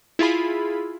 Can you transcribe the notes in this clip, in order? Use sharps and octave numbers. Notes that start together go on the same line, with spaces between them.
E4 F4 G#4 B5